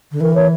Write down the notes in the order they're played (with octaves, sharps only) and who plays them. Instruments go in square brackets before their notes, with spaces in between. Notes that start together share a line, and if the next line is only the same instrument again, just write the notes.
[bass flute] D3
[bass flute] E3 [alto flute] A#4
[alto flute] C#5